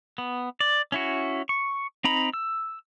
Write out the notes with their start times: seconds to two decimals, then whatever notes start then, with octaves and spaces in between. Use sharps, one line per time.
0.18 B3
0.60 D5
0.92 C#4 E4 F#4
1.49 C#6
2.04 C4 D#4 A#5 B5
2.34 E6